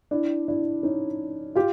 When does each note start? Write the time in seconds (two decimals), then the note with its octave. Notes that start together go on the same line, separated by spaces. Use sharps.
0.11 D4 E4
0.48 D4 E4
0.83 C#4 D#4
1.55 F4 G4